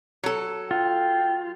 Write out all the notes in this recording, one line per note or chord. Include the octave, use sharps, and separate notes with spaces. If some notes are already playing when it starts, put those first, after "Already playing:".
F#3 A4
F4 G5